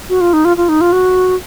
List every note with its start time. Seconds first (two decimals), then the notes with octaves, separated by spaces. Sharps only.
0.09 F#4
0.21 F4
0.33 D#4
0.45 F4
0.57 F4
0.69 D#4
0.81 F4
0.92 F#4